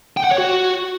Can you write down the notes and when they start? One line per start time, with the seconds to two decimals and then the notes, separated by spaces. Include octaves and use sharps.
0.17 G5
0.24 F#5
0.31 C#5
0.38 F#4